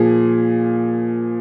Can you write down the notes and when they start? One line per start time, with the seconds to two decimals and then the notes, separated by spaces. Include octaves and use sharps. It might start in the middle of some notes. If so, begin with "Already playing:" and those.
Already playing: A#2 F3 G#4